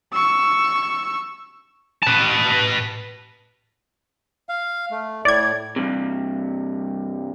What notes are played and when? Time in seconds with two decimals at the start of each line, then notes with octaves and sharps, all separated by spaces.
0.13 C#6 E6
2.03 B4 A5
4.49 F5
4.91 A3
5.25 A2 D5 G#6
5.76 G2 C3